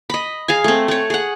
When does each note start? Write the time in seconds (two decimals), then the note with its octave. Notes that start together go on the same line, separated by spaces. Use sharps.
0.10 D#5 B5
0.48 G#4 F5 G#5
0.64 A3 C4
0.88 A3 C#5
1.10 G#4 F#5